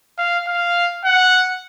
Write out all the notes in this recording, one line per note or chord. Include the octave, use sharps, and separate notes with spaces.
F5
F5
F#5